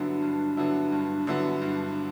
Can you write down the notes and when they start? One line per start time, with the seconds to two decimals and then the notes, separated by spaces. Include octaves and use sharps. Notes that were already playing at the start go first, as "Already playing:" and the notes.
Already playing: G2 D3 F#3 B3 D4 E4
0.23 G2
0.57 D3 F#3 B3 E4
0.92 G2
1.27 D3 F#3 B3 E4
1.62 G2